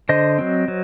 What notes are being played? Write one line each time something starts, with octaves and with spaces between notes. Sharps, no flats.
D3 C5 D#5
F#3 C4
F#3